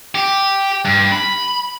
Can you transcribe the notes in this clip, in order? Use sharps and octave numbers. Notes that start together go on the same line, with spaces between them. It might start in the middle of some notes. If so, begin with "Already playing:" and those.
G4
G2
B5